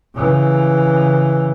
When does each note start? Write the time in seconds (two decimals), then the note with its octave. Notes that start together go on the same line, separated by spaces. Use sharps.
0.15 C#3 E3